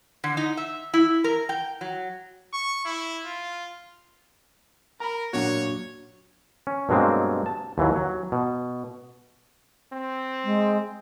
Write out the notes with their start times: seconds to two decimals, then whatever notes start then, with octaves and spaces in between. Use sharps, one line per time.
0.24 D3
0.37 D#4
0.57 E5
0.94 E4
1.24 A#4
1.49 G5
1.81 F#3
2.53 C#6
2.85 E4
3.25 F4
5.00 A#4 A#5 B5
5.33 A#2 F#3 A#3 D4 F#4 C#5
6.67 C#4
6.89 G2 B2 F#3 G#3 A#3 C4
7.46 A5
7.78 D#2 E3 F#3
7.96 F#3
8.32 B2
9.93 C4
10.44 G#3